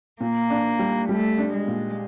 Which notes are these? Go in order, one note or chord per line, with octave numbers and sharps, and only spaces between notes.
A#2 A#3
D4
G3
G3 A3
D4
G#3
A#2